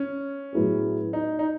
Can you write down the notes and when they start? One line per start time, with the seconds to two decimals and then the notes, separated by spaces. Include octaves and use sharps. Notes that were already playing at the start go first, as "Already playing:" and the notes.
Already playing: C#4
0.53 A2 F#3 B3 E4 G#4
1.13 D#4
1.39 D#4